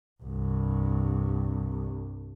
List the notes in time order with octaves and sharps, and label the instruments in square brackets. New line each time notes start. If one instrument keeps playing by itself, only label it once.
[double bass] C2 G2